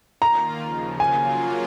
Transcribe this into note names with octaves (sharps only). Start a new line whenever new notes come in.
D#3 A#3 F4 A#5
D#2 C#3 F3
C#3 F#3 A#3 F4 G#5